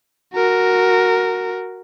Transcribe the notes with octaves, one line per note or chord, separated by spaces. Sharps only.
F#4 A#4